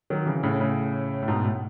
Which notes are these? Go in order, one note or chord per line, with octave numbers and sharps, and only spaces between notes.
D#3 F#3
C#3 E3
A2 C#3
A2 C#3
A2
G#2 B2
A2